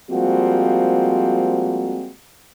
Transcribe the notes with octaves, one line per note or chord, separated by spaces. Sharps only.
F3 G3 G#3 A#3 C4 F#4